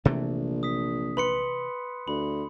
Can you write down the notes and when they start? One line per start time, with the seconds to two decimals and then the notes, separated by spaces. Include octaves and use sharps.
0.05 A#1 C3 E3 A3
0.63 D#6 B6
1.17 B4 B5 C6 C#7
2.08 D2 B5